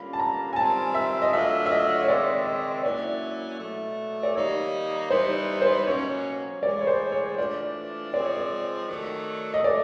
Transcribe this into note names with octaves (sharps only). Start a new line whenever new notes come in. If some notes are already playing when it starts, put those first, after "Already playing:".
Already playing: D3 G3 A#3 C#4 F4 B5
A5
A#5
G#5
D#3 G3 C4 F4 A5
E5
D#5
F#3 A3 D4 F4 E5
E5
D#5
C#5
D#3 G#3 C4 D5
D#5
F#3 A#3 C#4 E4 D5
B2 F#3 A3
D5
D#3 G3 A#3 D#4 C#5
E3 G3 B3 D#4 C5
C5
B2 F#3 A#3 C#4 C#5
A2 E3 G#3 B3 D5
C#5
C5
C#5
E3 A3 D4 F4 D5
F3 G#3 C4 D5
C#5
D5
D#3 F#3 A3
D#5
D#3 F#3 A3 D5